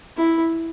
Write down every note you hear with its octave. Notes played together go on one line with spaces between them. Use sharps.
E4